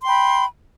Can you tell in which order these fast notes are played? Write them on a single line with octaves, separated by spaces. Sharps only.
C6 G5 B5